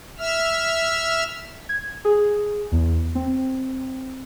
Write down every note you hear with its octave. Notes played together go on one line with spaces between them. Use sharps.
E5 E6 F6
G#6
G#4
E2
C4